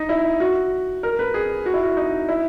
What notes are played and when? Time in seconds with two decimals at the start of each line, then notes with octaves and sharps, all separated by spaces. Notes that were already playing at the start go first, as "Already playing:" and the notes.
Already playing: D#4
0.09 E4
0.40 F#4
1.03 A#4
1.19 B4
1.34 G#4
1.66 F#4
1.74 E4
1.83 F#4
1.97 D#4
2.29 E4